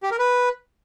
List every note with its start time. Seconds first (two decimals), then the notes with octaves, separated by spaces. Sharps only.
0.03 G4
0.11 A#4
0.19 B4